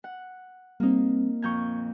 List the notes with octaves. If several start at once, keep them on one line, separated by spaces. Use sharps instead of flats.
F#5
G3 A#3 C4 D#4
F2 A#2 A#5 C#6 G6 G#6